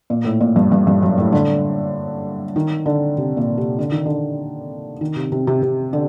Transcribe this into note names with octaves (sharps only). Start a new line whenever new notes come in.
A#2
A2
A#2
G2
G2
G2
F#2
A2
D3
D#3
D3
C3
A#2
C3
D3
D#3
D3
D#3
C3
C3
C3
C3
D3